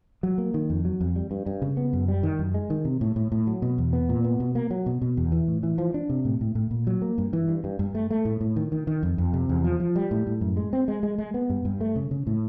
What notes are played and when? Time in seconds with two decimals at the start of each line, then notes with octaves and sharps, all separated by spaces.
0.23 F#3
0.38 A#3
0.54 D#3
0.70 F2
0.85 F#3
1.01 F2
1.16 G3
1.31 G2
1.46 G2
1.62 C#3
1.77 B3
1.93 F#2
2.08 G3
2.23 D#3
2.39 F#2
2.54 G#3
2.70 D#3
2.85 C3
3.01 A2
3.16 A2
3.32 A2
3.47 F#3
3.62 B2
3.78 E2
3.93 B3
4.09 A#2
4.24 B3
4.40 B2
4.55 A#3
4.70 F#3
4.86 B2
5.02 B2
5.17 E2
5.32 E3
5.48 A2
5.63 E3
5.78 F3
5.94 D4
6.10 C3
6.25 A2
6.41 A2
6.55 A2
6.71 A#2
6.87 F#3
7.02 A#3
7.18 G2
7.33 E3
7.48 G2
7.64 G2
7.79 G2
7.95 A3
8.10 A3
8.25 A2
8.41 A2
8.56 D#3
8.72 D#3
8.87 D#3
9.03 F2
9.18 F2
9.34 C3
9.49 E2
9.64 F3
9.80 F3
9.96 G3
10.11 A2
10.27 A2
10.41 F#2
10.57 G#3
10.73 C4
10.88 G#3
11.03 G#3
11.18 G#3
11.34 B3
11.50 G2
11.65 G2
11.81 A3
11.96 C#3
12.11 C#3
12.27 A2